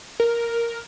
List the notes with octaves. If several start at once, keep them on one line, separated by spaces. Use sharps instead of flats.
A#4